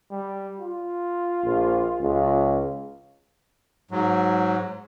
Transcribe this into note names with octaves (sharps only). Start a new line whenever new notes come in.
G3
F4
A#1
C#2
G#2 F#3